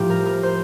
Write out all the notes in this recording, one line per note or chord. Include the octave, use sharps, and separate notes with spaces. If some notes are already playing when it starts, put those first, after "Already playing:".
Already playing: A2 F3 A#3 G4
A#4
A#4
C5